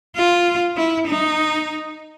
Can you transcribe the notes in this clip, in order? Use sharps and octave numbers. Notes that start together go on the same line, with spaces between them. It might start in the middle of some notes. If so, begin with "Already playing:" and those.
F4
E4
D#4